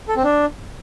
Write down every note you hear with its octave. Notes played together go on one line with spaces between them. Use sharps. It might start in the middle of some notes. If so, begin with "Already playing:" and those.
A4
C4
D4